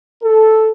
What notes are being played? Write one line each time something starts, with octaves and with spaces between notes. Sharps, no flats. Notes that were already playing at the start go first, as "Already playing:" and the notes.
A4